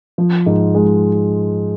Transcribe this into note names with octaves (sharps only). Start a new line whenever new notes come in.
F3
G#2
G#3